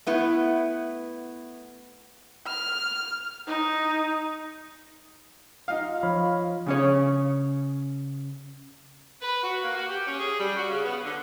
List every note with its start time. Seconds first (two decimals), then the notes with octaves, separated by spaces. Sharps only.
0.07 A3 B3 E4
2.46 F6
3.47 D#4
5.68 D#4 F4 F5
6.03 F3 C#5 B5
6.66 C#3 C#4 C#5
9.22 B4
9.43 F#4
9.63 A#3
9.76 F#4
9.88 G4
10.07 C#4
10.19 G#4
10.40 G3
10.56 F#4
10.69 C#3
10.84 B3
11.04 D3